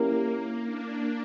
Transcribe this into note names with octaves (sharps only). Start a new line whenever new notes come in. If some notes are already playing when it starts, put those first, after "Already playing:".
Already playing: A#3 C#4 E4 G4 A#4
D4